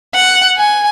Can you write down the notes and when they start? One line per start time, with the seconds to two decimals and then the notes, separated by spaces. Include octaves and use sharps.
0.15 F#5
0.58 G#5